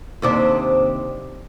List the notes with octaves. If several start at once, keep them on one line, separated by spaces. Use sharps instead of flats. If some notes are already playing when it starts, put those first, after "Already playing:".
D#2 C3 D4